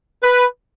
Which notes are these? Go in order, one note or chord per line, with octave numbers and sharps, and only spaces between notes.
B4